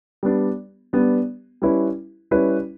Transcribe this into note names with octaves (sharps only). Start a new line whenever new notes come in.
G3 B3 D4
G3 B3 D4
G3 C#4 E4 B4
G3 C#4 E4 B4